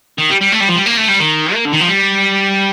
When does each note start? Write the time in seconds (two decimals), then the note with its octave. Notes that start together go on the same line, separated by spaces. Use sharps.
0.18 D#3
0.30 G3
0.41 G3
0.52 A3
0.60 G3
0.68 F3
0.76 G3
0.86 A#3
0.97 A3
1.09 G3
1.20 D#3
1.54 A#3
1.65 D3
1.73 D#3
1.80 F3
1.87 G3